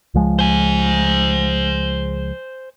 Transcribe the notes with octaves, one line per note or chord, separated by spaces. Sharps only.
C#2 F3 G#3
C5 G#5